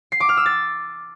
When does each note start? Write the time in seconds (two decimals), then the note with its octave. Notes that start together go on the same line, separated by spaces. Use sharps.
0.12 C7
0.20 D6
0.29 F6
0.37 E6
0.46 A6